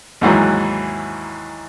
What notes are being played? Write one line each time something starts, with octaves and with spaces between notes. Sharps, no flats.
D#2 G#2 E3 F#3